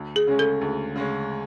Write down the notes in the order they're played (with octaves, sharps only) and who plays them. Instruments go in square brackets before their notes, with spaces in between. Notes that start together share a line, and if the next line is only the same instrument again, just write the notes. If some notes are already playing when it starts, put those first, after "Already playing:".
Already playing: [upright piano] D2
[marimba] G#4
[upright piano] C#3 G#3 C#4
[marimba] A4
[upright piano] D2
C#3 G#3 C#4